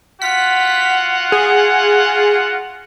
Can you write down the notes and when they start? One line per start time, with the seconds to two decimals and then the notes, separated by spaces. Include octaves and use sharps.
0.22 F4 F#4 F#5 B6
1.32 G#4